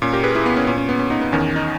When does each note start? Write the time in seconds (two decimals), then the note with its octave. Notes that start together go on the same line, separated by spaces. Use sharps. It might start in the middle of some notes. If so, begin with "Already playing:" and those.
0.02 A#2 C#4
0.13 G4 A#4
0.23 G#4 B4
0.35 E4 G#4
0.46 B3
0.57 C#4
0.67 A#2 C#4
0.78 C#4
0.89 B3
0.99 C#4
1.10 B3 D#4
1.21 B3
1.32 E2 D#3 C#4
1.56 D#4